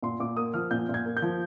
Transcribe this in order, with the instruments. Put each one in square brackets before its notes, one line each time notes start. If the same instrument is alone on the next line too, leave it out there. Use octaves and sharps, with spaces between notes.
[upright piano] A#2 C6
A#2 D6
A#3 D#6
F3 F6
A#2 G6
A#2
G#6
A#3
G6
F3